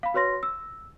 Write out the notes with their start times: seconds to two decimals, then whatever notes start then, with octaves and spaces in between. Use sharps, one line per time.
0.03 F5 B5
0.14 F#4 B4 C#5 C6 A#6
0.43 E6